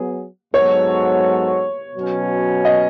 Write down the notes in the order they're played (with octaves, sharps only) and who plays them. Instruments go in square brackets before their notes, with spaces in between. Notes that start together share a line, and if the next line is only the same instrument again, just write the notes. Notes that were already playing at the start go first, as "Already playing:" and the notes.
Already playing: [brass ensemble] F#3 B3 G#4
[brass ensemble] G#2 F#3 B3 F#4 A4 [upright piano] C#5
[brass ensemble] B2 F#3 C#4
[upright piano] D#5